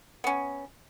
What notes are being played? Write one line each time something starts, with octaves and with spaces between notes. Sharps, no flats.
B3 C#4